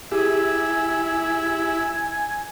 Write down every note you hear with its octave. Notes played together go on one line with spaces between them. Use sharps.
E4 G4 G#4 G#5